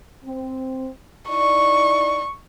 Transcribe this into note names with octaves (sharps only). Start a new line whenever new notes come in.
C4
D#4 E4 D5 C#6